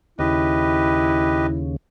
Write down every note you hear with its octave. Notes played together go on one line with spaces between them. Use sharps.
D#2 C#3 E4 G4 B4 D#5